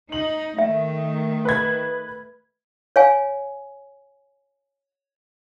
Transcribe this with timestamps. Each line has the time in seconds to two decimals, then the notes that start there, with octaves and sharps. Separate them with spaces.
0.12 D#4 F#7
0.59 D#3 A3 E5
1.45 B4 B5 G#6
2.96 C#5 F5 G#5